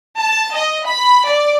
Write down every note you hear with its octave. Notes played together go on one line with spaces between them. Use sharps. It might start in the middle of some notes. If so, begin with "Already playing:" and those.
A5
D#5
B5
D5